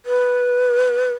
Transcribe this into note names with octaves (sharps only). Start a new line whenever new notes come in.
B4